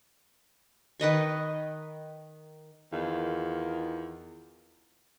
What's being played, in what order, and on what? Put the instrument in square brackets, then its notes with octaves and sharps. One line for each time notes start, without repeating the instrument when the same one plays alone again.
[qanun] D#3 B4 D#5 C#6
[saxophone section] E2 D#3 F4